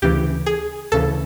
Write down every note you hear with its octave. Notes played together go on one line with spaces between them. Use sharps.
D2 C#3 E3 G4
G#4
D2 C#3 E3 A4